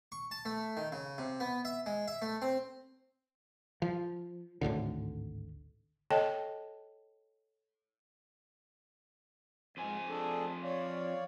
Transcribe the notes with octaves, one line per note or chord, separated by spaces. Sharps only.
C#6
A5
A3
D#3
C#3
C3
B3
E5
G#3
E5
A3
C4
F3
G#1 D2 A2 D3
A4 C#5 D#5 G5 A5
F2 G#2 C5 G#5
D4 G#4 A4
C#5 D5 F5